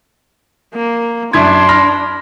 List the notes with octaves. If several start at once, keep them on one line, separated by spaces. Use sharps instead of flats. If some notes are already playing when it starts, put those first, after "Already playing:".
A#3
F#2 D4 E4 C6 G#6
B5 F6 A#6